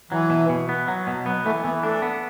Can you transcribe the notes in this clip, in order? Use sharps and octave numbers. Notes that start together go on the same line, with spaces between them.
E3 F#3
B2
B2
B3
F#3
B2
F#3 B3
E3 A3
E3 B3
A3 D4
B3